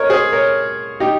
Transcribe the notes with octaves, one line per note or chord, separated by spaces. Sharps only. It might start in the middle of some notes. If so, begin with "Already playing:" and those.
Already playing: A#4 C#5 D#5
G#4 C5
A#4 C#5
D#4 G4